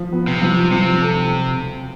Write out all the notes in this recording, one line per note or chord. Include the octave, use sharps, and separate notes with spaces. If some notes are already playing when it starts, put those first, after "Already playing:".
Already playing: F3
B3
C3
F3
C3 F3
A4